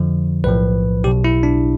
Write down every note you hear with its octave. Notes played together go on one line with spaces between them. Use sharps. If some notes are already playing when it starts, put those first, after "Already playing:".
Already playing: F2 D3 F3
B1 A2 F3 B4
B1 B2 G4
E4
D4